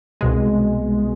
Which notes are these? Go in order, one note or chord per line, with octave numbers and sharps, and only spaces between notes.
C2 B2 G#3